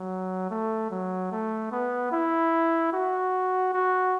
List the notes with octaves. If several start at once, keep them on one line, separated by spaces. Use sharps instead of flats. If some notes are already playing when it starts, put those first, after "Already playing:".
Already playing: F#3
A3
F#3
A3
B3
E4
F#4
F#4